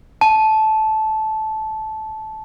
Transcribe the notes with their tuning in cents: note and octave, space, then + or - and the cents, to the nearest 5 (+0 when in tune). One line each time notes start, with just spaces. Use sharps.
A5 -15